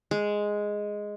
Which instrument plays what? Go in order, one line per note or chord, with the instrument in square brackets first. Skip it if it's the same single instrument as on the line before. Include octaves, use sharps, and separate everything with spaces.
[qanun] G#3